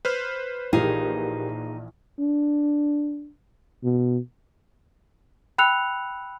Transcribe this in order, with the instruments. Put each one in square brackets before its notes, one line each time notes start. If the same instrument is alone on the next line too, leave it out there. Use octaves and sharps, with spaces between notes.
[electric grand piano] B4 C5 F6
[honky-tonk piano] A#1 E3 [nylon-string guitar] D#4 G#4 F5 [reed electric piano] G4 A#4
[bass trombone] D4
B2
[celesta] G5 B5 E6 F#6 C#7 F7